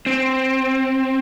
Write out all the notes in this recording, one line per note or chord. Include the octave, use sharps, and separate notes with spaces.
C4